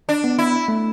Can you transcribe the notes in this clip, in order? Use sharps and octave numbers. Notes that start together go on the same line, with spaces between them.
D4
B3
E4
A3